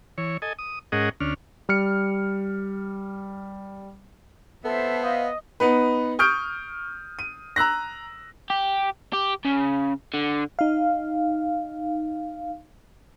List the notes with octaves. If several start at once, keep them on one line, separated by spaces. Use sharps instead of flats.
E3 C#5
A4 D#5 G#5
D#6
G#2 C#4 G#4 A#4 D#5 F#5
D2 C#4 D4 F6
G3 F6 C#7
B3 A4 C5 E5
D#5 F5
B3 D#4 B4
C#6 D#6 F6 G6 D7
D#7
A#5 E6 F#6 A#6
G4
G4
C#3
D3
D#4 F5